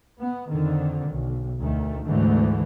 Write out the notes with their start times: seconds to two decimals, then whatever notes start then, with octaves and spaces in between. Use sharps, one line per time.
0.18 B3
0.48 F2 D3 D#3
1.08 B1
1.59 D2 D#3 A3
2.05 D2 G#2 D3 E3 A3